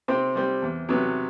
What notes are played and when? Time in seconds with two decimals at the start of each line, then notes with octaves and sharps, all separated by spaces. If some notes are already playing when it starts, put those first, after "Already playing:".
0.08 C3 C4 C5
0.35 G3 C4
0.62 E2
0.89 C3 F#3 B3